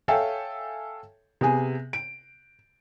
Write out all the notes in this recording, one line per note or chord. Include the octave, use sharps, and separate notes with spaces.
A4 C#5 E5 F5 G5 G#5
C3 B3 G#4 G#5
D7